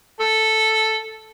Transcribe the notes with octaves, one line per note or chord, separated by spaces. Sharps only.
A4